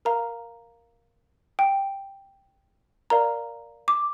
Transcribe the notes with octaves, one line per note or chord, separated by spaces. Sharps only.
A#4 F5 A#5
G5
A#4 D5 F5 A#5
D6